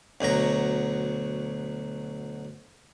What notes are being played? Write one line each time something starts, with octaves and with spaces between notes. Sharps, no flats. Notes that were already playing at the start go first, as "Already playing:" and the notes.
D2 B2 F#3 A#5